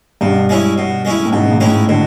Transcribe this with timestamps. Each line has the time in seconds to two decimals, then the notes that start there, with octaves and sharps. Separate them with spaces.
0.21 G2 B2
0.49 G#3 C#4 E4
0.78 B2
1.05 G#3 C#4 E4
1.25 A2
1.33 G#2 B2
1.52 G#2
1.60 A2 G#3 C#4 E4
1.88 B2 D3